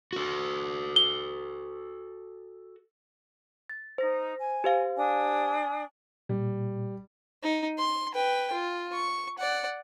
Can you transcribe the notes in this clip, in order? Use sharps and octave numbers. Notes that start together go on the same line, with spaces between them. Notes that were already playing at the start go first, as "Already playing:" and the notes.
F#4 A4
G7
A6
D#4 C5 A#6
G#5
G4 C5 F5
D4 G#5 D#6
A#2 G3
D#4
C6
B4 G5
F4
C#6
D5 F#5